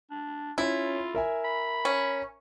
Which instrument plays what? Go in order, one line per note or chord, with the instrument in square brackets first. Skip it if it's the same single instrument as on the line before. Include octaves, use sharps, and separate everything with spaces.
[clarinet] D4
[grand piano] C#4 [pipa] E4 [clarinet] F4
[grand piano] A#4 E5 G#5
[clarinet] B5
[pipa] C#4